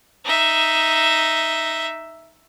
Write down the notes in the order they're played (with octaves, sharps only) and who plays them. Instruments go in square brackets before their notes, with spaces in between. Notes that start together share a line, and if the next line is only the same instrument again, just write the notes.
[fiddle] D#4 E5